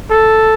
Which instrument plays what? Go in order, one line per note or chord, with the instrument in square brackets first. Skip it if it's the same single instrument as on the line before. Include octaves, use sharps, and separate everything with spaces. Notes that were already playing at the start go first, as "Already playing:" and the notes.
[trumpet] A4